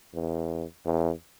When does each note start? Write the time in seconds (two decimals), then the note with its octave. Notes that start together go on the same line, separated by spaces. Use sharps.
0.13 E2
0.85 E2